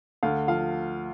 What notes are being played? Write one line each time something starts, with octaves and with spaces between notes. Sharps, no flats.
D2 F5
F3 F5